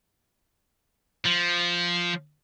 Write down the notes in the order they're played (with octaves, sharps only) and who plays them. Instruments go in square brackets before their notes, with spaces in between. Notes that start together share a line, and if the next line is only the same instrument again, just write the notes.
[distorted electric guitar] F3